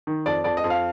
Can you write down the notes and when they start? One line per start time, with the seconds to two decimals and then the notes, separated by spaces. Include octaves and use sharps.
0.07 D#3
0.26 F2 D5
0.44 F2 D5
0.57 D#5
0.64 F2
0.70 F5